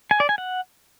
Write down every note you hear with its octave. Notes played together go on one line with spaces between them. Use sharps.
G#5
D5
G#5
F#5